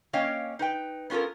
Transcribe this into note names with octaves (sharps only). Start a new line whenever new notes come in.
A#3 C#4 C#5 D#5 F5 G5
D#4 B4 G5
B3 C#4 F4 A4 A#4